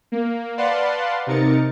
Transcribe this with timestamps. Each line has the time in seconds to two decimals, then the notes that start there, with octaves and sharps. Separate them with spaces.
0.12 A#3
0.58 B4 D5 F5 F#5 A5 C6
1.27 C3 D#4 A#4 A6 C#7